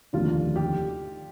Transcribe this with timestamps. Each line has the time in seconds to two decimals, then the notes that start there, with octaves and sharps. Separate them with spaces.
0.13 F1 D#2 D3 F4
0.56 G4